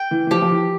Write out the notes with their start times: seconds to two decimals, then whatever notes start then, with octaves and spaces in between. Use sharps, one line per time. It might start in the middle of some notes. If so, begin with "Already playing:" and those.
Already playing: G5
0.11 E3
0.27 E3
0.31 F3 G4
0.42 F3
0.51 E3